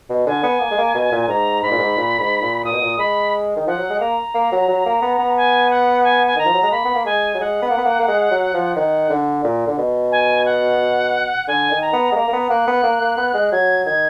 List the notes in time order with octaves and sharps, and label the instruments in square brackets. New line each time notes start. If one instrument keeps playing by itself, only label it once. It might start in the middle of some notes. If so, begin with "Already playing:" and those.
[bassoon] B2
[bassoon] D3 [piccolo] G#5
[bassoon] B3
A#3
G#3
A#3
B2
A#2
[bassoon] G#2 [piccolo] A#5
[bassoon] G#2 [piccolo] B5
[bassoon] A#2
G#2
A#2
G#2
A#2
[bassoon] A#2 [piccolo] D#6
[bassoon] B2
A#2
[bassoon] G#3 [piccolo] B5
[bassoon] D#3
[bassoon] F3 [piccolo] F#5
[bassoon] F#3
G#3
[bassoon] A#3 [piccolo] A#5
[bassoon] A#3
F#3
F#3
A#3
B3
B3
[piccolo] G#5
F#5
G#5
G#5
[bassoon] D#3 [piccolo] A#5
[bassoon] F3
F#3
G#3
[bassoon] A#3 [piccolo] B5
[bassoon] B3
A#3
[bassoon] G#3 [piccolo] G#5
[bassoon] F#3
[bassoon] G#3 [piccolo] F#5
[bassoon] B3
A#3
B3
A#3
A#3
G#3
F#3
F3
[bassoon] D#3 [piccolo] F#5
[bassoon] D3
A#2
D3
B2
[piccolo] G#5
F#5
[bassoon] D3 [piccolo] G#5
[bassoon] D#3
[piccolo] A#5
[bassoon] B3
G#3
[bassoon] A#3 [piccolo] A#5
[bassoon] A#3
B3
[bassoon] A#3 [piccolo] F#6
[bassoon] B3
A#3
A#3
B3
G#3
[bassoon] F#3 [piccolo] G#6
[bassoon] D#3 [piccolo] G#6